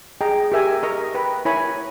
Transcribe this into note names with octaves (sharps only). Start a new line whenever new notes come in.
G#4 D#5 G5 A#5
G4 A#4 E5 G#5
A#4 D#5 A#5 C#6
B4 G5 B5
E4 A#4 C#5 G#5 B5